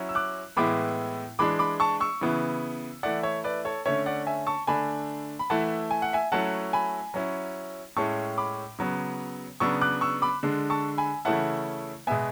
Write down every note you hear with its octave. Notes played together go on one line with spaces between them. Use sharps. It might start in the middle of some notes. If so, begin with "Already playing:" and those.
Already playing: F#3 C#4 E4
E6
D6 F#6
A2 E3 G#3 B3 E4 B5 D6
E3 G#3 D4 B5 D6
B5 D6
A5 C#6
C#6 E6
C#3 E3 B3 E4
E3 A3 E4 D5 F#5
C#5 E5
B4 D5
A4 C#5
D3 A3 C#4 C#5 E5
D5 F#5
E5 G#5
A5 C#6
D3 A3 D4 G#5 B5
B5
E3 A3 E4 F#5 A5
G#5
F#5
E5 G#5
F#3 A3 C#4 E4 F#5 A5
G#5 B5
F#3 C#4 E4
A2 G#3 C#4 E4 A5 C#6
B5 D6
C#3 F#3 B3
C#3 F#3 B3 D4 C#6 E6
D6 F#6
C#6 E6
B5 D6
D3 G#3 D4
A5 C#6
G#5 B5
C#3 E3 A3 C#4 E4 F#5 A5
B2 G#3 B3 E5 G#5